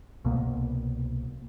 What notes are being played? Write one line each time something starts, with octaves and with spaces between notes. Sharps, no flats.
C2 B2 A#3 B3